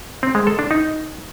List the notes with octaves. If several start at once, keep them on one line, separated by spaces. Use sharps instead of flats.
C4
G#3
A4
D4
D#4